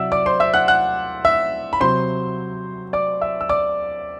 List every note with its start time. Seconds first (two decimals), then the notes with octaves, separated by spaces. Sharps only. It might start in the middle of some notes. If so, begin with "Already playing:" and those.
Already playing: C3 F#3 D5 E5 F#5 E6
0.12 D5 D6
0.26 C5 C6
0.40 E5 E6
0.54 F#5 F#6
0.68 F#5 F#6
1.25 E5 E6
1.73 B5
1.80 C3 F#3 C5 C6
2.93 D5 D6
3.21 E5 E6
3.41 E6
3.49 D5 D6